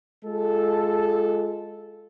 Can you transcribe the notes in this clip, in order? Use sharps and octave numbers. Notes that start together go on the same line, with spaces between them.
G#3 F4 A4